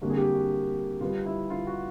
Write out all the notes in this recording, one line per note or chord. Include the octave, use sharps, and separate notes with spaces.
F2 D3 G3 A#3 F#4
G#4
G4
F#4
B2 G3 B3 F4
E4
F4
F#4